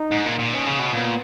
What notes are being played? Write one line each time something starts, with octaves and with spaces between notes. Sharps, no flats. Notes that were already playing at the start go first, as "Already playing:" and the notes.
Already playing: D#4
G#2
A#2
A#2
B2 C#4
C#3
B2
A#2 B3